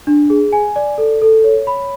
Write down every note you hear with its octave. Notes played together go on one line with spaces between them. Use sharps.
D4
G#4
G#5
D5
A4
A4
C#5
B5